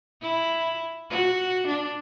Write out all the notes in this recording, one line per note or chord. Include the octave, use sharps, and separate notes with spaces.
E4
F#4
D4